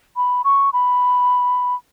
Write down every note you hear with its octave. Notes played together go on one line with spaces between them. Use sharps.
B5
C#6
B5